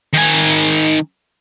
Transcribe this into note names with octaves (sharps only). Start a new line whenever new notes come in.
D#3 G#5